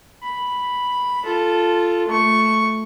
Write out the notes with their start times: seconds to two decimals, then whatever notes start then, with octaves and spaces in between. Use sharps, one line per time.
0.23 B5
1.24 F4 A4
2.07 A3 C#6